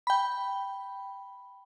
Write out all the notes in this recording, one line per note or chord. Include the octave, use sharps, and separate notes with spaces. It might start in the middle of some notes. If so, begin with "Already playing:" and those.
G5 B5